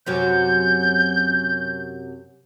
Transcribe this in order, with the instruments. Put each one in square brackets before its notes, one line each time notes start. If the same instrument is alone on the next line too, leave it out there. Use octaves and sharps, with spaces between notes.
[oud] F#2 C3 F#3 [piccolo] G6